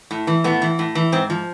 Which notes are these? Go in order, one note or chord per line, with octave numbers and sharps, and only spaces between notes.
A2
E3
A2 B3
E3
A2
E3
G#2 C4
F3